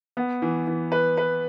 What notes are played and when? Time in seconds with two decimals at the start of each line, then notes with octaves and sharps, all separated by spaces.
0.17 B3
0.42 E3
0.67 E3
0.92 B4
1.17 B4